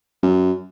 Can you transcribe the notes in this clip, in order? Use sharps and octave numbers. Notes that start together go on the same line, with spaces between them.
F#2